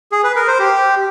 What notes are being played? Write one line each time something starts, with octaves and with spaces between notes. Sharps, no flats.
G#4
B4
A#4
C5
G4